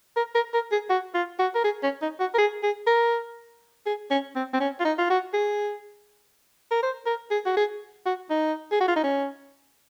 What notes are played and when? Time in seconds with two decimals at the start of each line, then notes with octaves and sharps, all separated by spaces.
0.17 A#4
0.35 A#4
0.53 A#4
0.72 G#4
0.90 F#4
1.15 F4
1.39 F#4
1.55 A#4
1.64 G#4
1.83 C#4
2.02 D#4
2.20 F#4
2.34 A#4
2.38 G#4
2.63 G#4
2.87 A#4
3.86 G#4
4.10 C#4
4.35 C4
4.53 C4
4.60 C#4
4.80 F4
4.85 D#4
4.99 F4
5.10 F#4
5.33 G#4
6.71 A#4
6.83 C5
7.06 A#4
7.31 G#4
7.46 F#4
7.57 G#4
8.06 F#4
8.30 D#4
8.72 G#4
8.80 F#4
8.88 F4
8.96 D#4
9.04 C#4